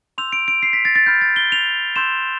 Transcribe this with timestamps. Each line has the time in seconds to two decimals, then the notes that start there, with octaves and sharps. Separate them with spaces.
0.18 C6 E6 G6 F7
0.32 D7
0.48 D7
0.63 C7
0.73 B6
0.85 A6
0.95 A6
1.07 B5 F6 G6
1.21 A6
1.36 G7
1.52 F7
1.96 C6 E6 G6 E7